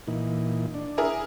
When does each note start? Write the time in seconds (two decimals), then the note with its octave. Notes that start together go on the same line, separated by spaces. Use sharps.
0.07 A#2 E3 D#4
0.74 D4
0.98 E4 G#4 A#4